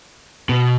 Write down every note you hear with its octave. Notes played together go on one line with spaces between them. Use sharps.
B2